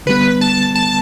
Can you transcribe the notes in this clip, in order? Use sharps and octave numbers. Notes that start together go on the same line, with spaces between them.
D3 G3 B3 B4
A5
A5